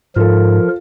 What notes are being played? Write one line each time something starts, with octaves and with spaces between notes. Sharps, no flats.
G#2 F3 F4 A4 A#4